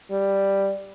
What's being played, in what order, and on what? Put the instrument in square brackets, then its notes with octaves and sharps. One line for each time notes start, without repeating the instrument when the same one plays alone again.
[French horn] G3